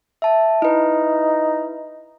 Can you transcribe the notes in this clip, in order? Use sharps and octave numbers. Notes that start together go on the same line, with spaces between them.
E5 A5
D#4 E4 B4